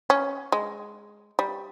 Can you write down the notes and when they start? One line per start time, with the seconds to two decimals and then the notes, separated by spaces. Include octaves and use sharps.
0.10 C#4
0.52 G#3
1.39 G3